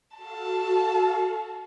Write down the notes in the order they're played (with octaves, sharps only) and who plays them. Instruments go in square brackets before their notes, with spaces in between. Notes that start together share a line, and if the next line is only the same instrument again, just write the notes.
[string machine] F#4 A4 F5 [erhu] A5